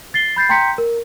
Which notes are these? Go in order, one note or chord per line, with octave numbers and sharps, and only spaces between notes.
A6 C7 G7
B5 G6 A6 C7
G5 A#5 C6 G6 B6 C#7
A#4